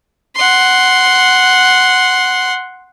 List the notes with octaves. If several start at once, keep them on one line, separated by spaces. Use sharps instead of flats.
F#5 C6